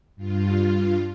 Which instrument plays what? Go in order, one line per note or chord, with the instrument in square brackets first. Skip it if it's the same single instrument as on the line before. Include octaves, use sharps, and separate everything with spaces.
[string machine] G2 F4